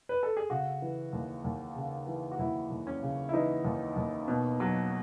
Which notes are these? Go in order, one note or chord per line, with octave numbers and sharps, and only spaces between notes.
B4
A4
G#4
C#3 F#4
E3
D#2
D#2
C#3
E3
F#4
D#2 E4
D#2
C#4
C#3
E4
E3 D#4
D#2
D#2
B2
F#3